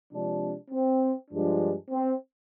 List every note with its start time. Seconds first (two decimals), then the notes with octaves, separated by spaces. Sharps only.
0.11 C3 F3 G#3 D4
0.71 C4
1.31 G2 F3 G#3 D4
1.91 C4